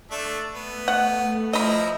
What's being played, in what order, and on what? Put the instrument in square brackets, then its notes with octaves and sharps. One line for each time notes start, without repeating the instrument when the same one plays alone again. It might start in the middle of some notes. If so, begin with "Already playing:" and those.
[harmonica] A3 D4 E5
[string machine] A3 [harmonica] B3
[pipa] F#5
[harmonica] F3 E4 A#5 [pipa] D#5 B5